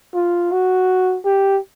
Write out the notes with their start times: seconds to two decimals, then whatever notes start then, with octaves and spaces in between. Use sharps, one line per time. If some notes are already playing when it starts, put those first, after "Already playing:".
0.15 F4
0.51 F#4
1.25 G4